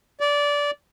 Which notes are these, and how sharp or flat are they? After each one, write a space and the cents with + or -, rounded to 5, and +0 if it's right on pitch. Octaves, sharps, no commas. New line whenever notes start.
D5 -20